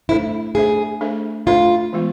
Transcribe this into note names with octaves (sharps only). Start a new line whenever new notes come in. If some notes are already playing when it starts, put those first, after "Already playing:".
A3 D4 E4 A4 C5 E5
A3 D4 G#4 A4 C5 E5
A3 D4 A4 C5 E5
A3 D4 F4 A4 C5 E5
E3 G#3 B3 F4